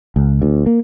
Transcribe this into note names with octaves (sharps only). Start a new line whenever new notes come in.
C#2
D2
A#3